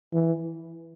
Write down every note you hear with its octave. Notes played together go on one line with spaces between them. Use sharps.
E3